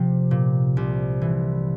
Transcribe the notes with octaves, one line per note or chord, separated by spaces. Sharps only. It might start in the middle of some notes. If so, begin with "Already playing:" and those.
Already playing: C3 F3
A#2
C2
E3